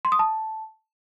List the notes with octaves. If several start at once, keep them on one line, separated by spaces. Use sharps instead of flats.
C6
D#6
A5